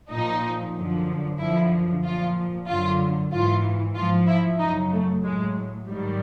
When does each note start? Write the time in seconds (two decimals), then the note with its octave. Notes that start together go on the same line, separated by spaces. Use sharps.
0.11 A#2 F3 D#4
0.75 F#2 D3 F3
1.39 F#2 D3 F3 E4
2.04 A#2 F3 F4
2.67 F#2 D3 F#3 F4
3.32 G#2 E3 F4
3.96 G#2 F3 F4
4.27 E4
4.60 F#2 C#3 F#3 D#4
4.92 A3
5.24 A2 F#3 G#3
5.87 G#2 D#3 F#3 G3